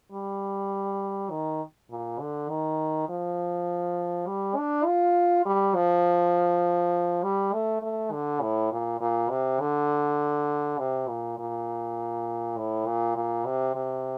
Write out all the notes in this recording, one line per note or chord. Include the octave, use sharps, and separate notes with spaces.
G3
D#3
A#2
D3
D#3
F3
G3
D4
F4
G3
F3
G3
A3
A3
D3
A2
A#2
A#2
C3
D3
C3
A#2
A#2
A2
A#2
A#2
C3
C3